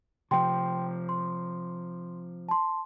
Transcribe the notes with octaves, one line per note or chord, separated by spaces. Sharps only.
C3 F3 G5 C6
C6
A5 C6